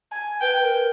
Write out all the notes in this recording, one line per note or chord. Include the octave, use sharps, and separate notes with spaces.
G#5
B4 G5
A#4